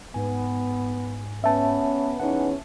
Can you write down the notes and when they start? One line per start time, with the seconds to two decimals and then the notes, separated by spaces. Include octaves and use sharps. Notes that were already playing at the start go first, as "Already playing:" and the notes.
0.14 G#2 B3 G#5
1.44 B3 C#4 E5 A5
2.20 E2 C#4 D#4 B4 F#5